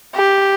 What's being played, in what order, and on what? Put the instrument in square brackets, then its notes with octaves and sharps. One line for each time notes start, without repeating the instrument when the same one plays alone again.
[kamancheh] G4